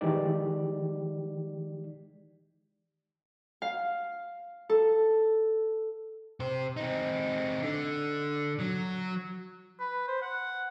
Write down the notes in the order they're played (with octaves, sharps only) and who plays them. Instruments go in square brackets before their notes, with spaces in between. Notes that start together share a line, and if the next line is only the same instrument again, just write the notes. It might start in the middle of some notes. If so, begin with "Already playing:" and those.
[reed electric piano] D#3 E3 G#3 D#4 G4 D5
[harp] F5
A4
[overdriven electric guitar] C3 C5
C4 D#4
D3
F#3
[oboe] B4
C5
F#5